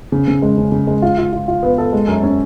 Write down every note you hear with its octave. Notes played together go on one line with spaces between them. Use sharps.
C#3
C#3
G#3
C#3
C#3
G#3
F4
F4
F4
F4
B3
A4
G#3
F#2
C#4